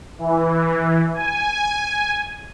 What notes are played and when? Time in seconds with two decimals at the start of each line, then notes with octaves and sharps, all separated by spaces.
0.19 E3
1.14 G#5